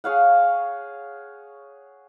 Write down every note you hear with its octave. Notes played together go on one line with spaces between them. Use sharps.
G#4 C#5 F5 F#5